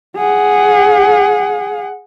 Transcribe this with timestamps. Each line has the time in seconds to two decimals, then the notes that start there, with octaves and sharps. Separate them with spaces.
0.17 G#4 F#5